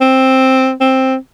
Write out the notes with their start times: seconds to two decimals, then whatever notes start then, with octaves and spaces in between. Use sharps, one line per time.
0.01 C4
0.80 C4